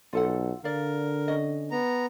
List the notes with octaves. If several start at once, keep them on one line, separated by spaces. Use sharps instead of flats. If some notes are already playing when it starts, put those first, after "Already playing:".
B1 F4 A4 F#5
D3 A#4 D5 F5
C#4 D#5
B3 A#5